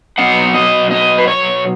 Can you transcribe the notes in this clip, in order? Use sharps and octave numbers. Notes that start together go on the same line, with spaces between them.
B2 F#3 B3 D#4 F#5
D#5
D#5
B4
C#5